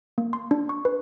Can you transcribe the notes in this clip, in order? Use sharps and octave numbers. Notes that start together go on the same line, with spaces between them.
A#3
C6
D4
C#6
B4